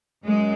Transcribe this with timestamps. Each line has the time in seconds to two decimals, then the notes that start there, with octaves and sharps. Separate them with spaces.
0.25 F#2 G#3